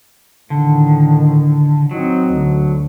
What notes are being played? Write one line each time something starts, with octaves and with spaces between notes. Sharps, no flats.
A2 D3 D#3
F#3 C4 D#4
D2